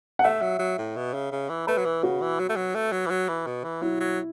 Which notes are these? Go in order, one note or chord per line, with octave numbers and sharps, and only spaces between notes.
F#5
A3 E5
F#3
F#3
A2
B2
C#3
C#3
E3
A3 B4
F#3
E3
C#3 F#4
E3
F#3
A3
F#3
A3
F#3
E3
F#3
E3
B2
E3
F#3 E4
F#3